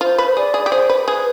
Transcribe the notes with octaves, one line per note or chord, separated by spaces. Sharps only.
F4 C5
B4
C5
G#4 D5
G#4
G4
G#4 C5
B4
G#4 B4